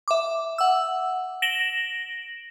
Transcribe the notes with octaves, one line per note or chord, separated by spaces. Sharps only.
E5 D6
F#5 E6
A#6 D7 E7 F#7 G7